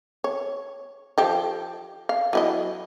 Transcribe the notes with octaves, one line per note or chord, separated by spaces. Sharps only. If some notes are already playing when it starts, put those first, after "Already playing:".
C#5
F3 G4 A4
F5
F#3 E4 D#5